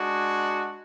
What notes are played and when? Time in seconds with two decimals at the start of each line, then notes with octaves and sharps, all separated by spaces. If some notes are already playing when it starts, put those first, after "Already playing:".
Already playing: G#3 D4 F#4